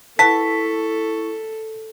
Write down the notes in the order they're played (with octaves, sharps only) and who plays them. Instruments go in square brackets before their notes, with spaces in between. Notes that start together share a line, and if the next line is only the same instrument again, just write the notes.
[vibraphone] E4 C#6 [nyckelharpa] A4 [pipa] B4 F#5 A5 [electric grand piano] B6